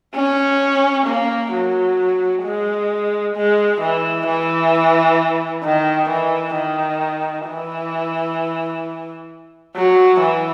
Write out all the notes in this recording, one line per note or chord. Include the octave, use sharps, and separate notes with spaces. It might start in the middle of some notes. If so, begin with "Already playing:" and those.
C#4
A#3
F#3
G#3
G#3
E3
E3
D#3
E3
D#3
E3
F#3
E3